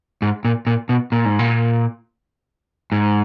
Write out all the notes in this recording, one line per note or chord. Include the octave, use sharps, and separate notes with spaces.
G#2
A#2
A#2
B2
A#2
G#2
A#2
G#2